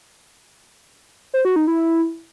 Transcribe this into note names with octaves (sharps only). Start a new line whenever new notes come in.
C5
F#4
D#4
E4